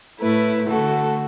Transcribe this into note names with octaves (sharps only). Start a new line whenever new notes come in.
A2 A3 E4 B4
D3 A3 F#4 A4